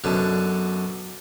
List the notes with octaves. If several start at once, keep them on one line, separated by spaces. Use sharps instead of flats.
F#2 B2 D3